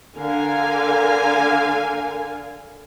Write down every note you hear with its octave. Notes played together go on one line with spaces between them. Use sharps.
D3 A#4 F5 G#5